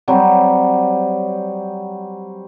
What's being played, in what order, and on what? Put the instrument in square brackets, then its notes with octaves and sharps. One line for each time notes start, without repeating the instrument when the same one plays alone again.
[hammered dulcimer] F#3 G3 C4